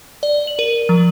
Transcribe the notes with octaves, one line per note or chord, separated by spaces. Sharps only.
D5
F#7
A#4
F3